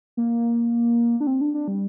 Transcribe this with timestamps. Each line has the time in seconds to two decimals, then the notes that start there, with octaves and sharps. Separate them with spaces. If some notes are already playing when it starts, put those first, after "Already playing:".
0.17 A#3
1.20 D4
1.27 C4
1.41 D4
1.54 D4
1.68 G3